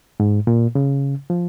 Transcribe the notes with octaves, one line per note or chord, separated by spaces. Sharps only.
G#2
A#2
C#3
F3